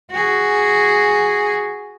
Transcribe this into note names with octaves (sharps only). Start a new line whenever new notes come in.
F#4 G#4